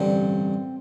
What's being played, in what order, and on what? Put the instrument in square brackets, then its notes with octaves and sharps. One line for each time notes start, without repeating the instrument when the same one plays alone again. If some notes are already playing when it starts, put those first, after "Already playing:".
Already playing: [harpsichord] A1 G2 D3 [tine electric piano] C4